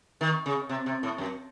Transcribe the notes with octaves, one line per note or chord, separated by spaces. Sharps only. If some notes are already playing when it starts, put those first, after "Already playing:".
D#3
C#3
C3
C3
A2
F#2